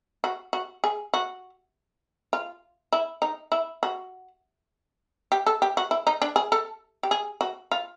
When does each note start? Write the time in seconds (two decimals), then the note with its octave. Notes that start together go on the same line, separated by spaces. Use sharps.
0.24 F#4
0.53 F#4
0.84 G#4
1.14 F#4
2.33 F4
2.93 E4
3.22 D#4
3.52 E4
3.83 F#4
5.32 G4
5.47 A4
5.62 G4
5.77 F#4
5.91 E4
6.07 D#4
6.22 D4
6.36 G#4
6.52 A4
7.03 G4
7.11 G#4
7.41 F#4
7.72 F4